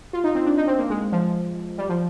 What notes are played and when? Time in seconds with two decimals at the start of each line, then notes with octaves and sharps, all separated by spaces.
0.13 F4
0.24 D#4
0.35 C4
0.46 D4
0.57 D#4
0.67 C4
0.79 A#3
0.90 G#3
1.12 F3
1.78 G3
1.89 F3